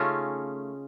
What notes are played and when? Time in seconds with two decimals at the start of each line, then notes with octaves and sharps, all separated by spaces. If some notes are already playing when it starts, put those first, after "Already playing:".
Already playing: C#3 A3 C#4 D#4 F4